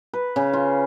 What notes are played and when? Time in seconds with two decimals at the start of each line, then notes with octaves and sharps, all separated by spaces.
0.13 B4
0.36 C#3
0.53 F4